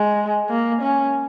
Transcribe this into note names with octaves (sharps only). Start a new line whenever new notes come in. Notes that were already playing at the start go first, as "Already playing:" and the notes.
Already playing: G#3
A#3
C#4